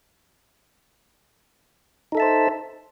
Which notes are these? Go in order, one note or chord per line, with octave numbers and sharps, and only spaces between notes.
D#4 A4 C5 E5 A5